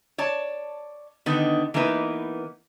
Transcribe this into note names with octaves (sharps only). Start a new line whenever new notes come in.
C#5 D5 A5
D3 D#3 B3 D#4
E3 A#3 B3 D#4 B4